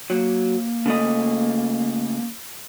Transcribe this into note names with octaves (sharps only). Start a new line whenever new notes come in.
F#3 A#3
C#3 A3 D#5